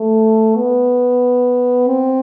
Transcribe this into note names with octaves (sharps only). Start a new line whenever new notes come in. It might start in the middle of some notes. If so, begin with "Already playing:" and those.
Already playing: A3
B3
C4